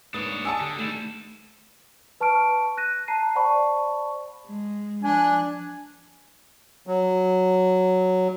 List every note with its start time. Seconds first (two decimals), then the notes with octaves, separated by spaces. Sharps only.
0.14 G#2 A#3 D4 B4 C#5 D#6
0.45 F#5 G#5 A5 D#6 E6
0.61 D3 G4
0.78 D#3 G3 A3 E4
2.20 B4 A5 C#6 F6 D7
2.77 F#6 A#6 D#7
3.08 A5 A#5 C7 D#7
3.36 C5 D5 F#5 A5 B5 C#6
4.45 G#3
5.03 F3 D4 G#5 F#6
6.87 F#3